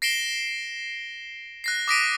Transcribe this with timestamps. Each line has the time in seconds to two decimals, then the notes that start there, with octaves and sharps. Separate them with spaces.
0.02 A#6 C7 D7 E7 G7
1.64 F#6 A#6 C7
1.88 D6 D#6 A#6 B6 D7 D#7